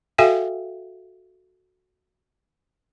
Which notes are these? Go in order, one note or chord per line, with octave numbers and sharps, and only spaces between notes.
F#4 A4 E5 F5 G5 G#5